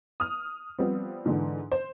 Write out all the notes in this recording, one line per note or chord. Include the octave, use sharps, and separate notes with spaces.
D#6 F6
F3 G3 B3 C4
G#2 D3 E3
C5